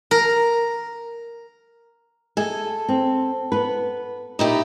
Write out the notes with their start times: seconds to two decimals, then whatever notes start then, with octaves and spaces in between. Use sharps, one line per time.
0.11 A#4
2.37 G#4 A4 D#5 G#5
2.89 C4
3.52 B3 B4
4.39 A#2 D#4 E4 G4